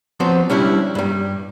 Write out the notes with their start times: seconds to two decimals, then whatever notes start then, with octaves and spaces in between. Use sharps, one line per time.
0.20 F3 F#3 B3 C4 C5
0.50 G3 C#4 D4 E4 G4
0.95 G2 G3